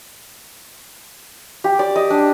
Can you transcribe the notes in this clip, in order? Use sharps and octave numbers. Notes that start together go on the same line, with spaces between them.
G4
D5
D#5
D4